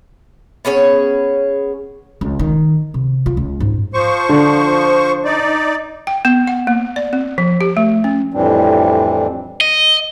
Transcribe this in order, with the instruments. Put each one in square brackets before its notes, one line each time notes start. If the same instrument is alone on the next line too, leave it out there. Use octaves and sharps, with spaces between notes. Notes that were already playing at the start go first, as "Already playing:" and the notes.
[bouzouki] B3 C#4 G#4 C#5
[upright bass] C#2
D#3
C3
F4
C#2
G#2
[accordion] F3 C5 C#6
[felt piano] D3
[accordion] D#4 D5
[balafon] G5
B3
F#5
A#3
D5
C4
F3
G4
A3
C#4
[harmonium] F2 A2 E3 G3 C4 D4
[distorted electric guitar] D#5